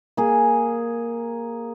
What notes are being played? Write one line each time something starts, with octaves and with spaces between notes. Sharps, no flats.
A#3 G#4